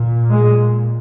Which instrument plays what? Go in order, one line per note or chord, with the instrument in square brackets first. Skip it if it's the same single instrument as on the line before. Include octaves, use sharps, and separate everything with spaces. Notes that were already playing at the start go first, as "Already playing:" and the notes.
Already playing: [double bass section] A#2
G#3